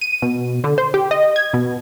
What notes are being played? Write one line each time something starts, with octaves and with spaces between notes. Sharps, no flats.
D#7
B2
D3
C5
G4
D#5
G#6
B2